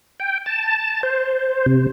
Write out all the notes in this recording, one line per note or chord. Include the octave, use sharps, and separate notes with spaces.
G5
A5
C5
C3